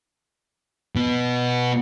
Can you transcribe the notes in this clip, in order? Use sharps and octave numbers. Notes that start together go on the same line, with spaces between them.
B2 B3